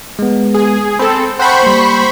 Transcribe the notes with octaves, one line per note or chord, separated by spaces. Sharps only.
G#3 B3
G#4
C4 A4 B5
C5 F#5 G5 A5 B5 C#6
G3 A#3